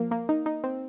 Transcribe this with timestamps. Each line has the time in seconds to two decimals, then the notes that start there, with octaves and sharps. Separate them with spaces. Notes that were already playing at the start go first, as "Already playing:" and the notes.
Already playing: F3 A#3
0.11 A#3
0.29 D#4
0.46 D#4
0.64 C4